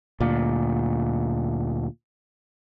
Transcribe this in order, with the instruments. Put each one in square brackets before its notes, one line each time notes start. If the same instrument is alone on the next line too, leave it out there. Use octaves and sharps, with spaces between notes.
[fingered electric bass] D2 A#2